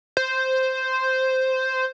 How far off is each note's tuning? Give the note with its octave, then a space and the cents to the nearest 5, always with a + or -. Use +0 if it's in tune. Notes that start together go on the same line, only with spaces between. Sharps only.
C5 -5